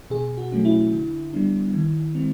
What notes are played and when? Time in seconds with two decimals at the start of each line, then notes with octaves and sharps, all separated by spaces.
0.10 B2 G#4
0.37 F#4
0.52 F#3 A3 C#4
0.65 E4
0.93 D3
1.33 G3 B3 D4
1.74 D#3
2.15 G#3 C4